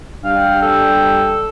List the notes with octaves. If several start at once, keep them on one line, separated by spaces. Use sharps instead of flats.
G3 D4 F5 G5
A4